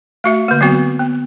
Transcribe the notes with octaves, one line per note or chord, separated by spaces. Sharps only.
A3 F#4 E5
D3 A#3
F#3 B3 C4 F#4
B3